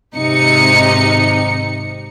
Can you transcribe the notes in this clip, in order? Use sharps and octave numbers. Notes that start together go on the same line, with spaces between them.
G#1 C3 D#4 C#7